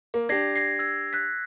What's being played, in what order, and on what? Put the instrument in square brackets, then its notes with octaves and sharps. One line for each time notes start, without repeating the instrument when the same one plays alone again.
[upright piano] A#3
[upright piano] D4 G4 [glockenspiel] G#6 A#6 C7
[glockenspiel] G#6 A#6 C7
E6 G#6
F#6 B6